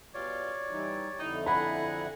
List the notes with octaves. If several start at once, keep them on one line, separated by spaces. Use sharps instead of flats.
B2 G3 F4 C#5 D5
E3 G3 D#4
F2 D3 D#4 E4
G#4 F#5 G#5 A#5 B5